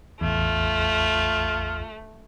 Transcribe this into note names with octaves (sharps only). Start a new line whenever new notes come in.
A1 E2 A3 F4